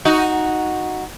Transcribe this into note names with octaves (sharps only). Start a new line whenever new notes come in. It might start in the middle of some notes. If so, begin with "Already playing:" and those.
D#4 F#4